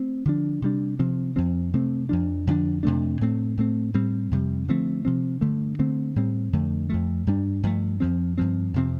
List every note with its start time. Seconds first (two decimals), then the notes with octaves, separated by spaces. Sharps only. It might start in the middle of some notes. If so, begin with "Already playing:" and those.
Already playing: A3 C4
0.25 D3 F3 D4
0.62 C3 G3 D4
0.99 C3 F3 C4
1.36 F2 F3 C4
1.74 C3 A3 C4
2.09 F2 F3 D4
2.47 F2 D3 F3 D4
2.83 F2 C3 A3 D4
3.21 A2 A3 C4
3.57 A2 A3 C4
3.94 A2 G3 C4
4.31 F2 C3 G3
4.68 D3 F3 A3 C4
5.05 C3 F3 C4
5.41 G2 D3 A3
5.79 D3 A3 C4
6.16 A2 G3 C4
6.53 F2 D3 A3
6.89 F2 F3 A3
7.27 G2 G3 D4
7.63 G2 F3 A3
8.00 F2 F3 C4
8.38 G2 F3 C4
8.74 F2 C3 F3 C4